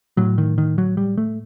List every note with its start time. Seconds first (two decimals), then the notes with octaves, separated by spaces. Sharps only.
0.17 A2 F#3
0.38 D#3
0.58 D#3
0.78 F#3
0.97 G3
1.18 A3